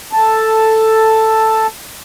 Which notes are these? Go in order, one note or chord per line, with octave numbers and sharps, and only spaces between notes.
A4 A5